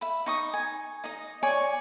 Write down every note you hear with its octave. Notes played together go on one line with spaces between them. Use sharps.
E5 B5
D#4 C#6 D#6
G#5
D#4 D#5
C#5 D5 G#5 C#6